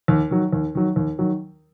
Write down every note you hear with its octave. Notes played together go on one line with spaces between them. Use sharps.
D#2
D#3 F#3
D#2
D#3 F#3
D#2
D#3 F#3